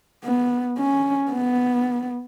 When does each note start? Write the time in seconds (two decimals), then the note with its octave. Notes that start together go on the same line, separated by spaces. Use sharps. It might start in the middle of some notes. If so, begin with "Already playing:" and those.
0.25 B3
0.79 C#4
1.32 B3